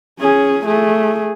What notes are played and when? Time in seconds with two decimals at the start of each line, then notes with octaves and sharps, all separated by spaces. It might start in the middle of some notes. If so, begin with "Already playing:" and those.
0.19 C#4 G#4
0.66 A3 G#4